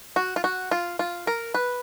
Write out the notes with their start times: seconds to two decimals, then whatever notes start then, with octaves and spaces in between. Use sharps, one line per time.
0.16 F#4
0.36 F4
0.44 F#4
0.71 F4
0.99 F4
1.27 A#4
1.54 B4